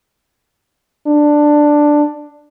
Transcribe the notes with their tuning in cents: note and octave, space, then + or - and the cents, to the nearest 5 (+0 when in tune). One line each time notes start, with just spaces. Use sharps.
D4 +5